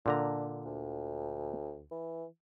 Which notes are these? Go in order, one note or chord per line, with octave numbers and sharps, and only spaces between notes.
A#2 D3 D4 A#5
D2
E3